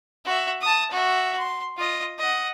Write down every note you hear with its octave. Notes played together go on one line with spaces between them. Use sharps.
F#4 E5
A5 D#6
F#4 E5
C6
F4 D#5
D#5 F#5